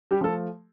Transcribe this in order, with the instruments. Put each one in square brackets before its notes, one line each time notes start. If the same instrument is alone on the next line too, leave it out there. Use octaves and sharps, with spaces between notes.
[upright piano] G3 G4
F3 A3 A4